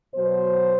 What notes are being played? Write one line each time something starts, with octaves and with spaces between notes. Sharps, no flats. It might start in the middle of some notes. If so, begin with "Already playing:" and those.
B2 F#3 C5